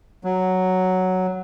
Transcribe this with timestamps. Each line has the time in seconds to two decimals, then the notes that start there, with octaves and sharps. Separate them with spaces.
0.24 F#3